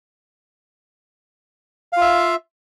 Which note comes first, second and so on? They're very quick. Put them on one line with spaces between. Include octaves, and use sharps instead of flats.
F5 F4 E5